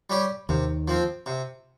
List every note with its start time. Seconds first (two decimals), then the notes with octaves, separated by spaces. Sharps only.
0.10 G3 C#4 G4
0.49 D#2 C3 D#3
0.88 F3 C4
1.26 C3